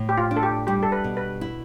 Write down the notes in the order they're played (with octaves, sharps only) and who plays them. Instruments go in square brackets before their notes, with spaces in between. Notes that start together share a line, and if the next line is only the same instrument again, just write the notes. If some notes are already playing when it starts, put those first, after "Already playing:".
Already playing: [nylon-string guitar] A2
[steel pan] G4
F4
[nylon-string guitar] D4
[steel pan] A4
G4
[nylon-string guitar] G3 [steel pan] G4
[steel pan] A4
B4
[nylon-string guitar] B2
[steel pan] B4
[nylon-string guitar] E4